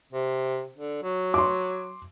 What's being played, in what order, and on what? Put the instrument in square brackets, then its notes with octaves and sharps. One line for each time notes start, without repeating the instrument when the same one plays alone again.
[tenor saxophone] C3
D3
F#3
[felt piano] C6 D6